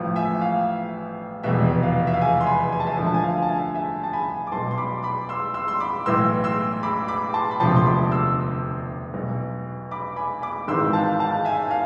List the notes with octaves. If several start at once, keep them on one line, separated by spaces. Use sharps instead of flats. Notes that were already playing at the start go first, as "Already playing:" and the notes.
Already playing: A1 A2 F3 F5
E5 G#5
F5
F1 E2 B2 E5
F5
E5
F5
E5 G#5
C6
G#5 B5
G#5
A5
E5 G#5
D2 D3 F3 G#5
A5
E5 G#5
F5
A5
E5 G#5
E5 G#5
A5
G#5 B5
D6
B1 B2 A5 C6
C6
B5 D6
B5 D6
C6 E6
C6 E6
C6
B5 D6
B1 A2 E3 C6 E6
C6 E6
B5 D6
B5 D6
A5 C6
B5
E1 D2 C3 F3 A5 C6
C6
B5 D6
C6 E6
B1 B2
B5 D6
G#5 B5
B5 D6
G#1 G#2 E3 C6 E6
F5 A5
F5 A5
E5 G#5
F5